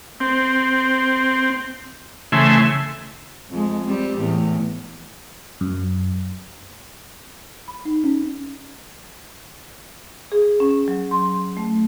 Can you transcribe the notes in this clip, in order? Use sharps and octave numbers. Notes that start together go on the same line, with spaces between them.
C4
C#3 E3 A3 E5 G#5 C6
F2 G#3
G3 C4
E2 A2
F#2
B5
D#4
C#4
G#4
C#4
F#3
C6
A3